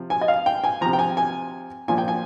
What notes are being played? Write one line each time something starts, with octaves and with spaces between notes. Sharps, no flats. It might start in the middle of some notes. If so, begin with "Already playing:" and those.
Already playing: C3 F3
G#5
D#5
F5
G5
G#5
C3 F3 A#5
G5
G#5
G#5
A#2 F3 G#5
G5
G#5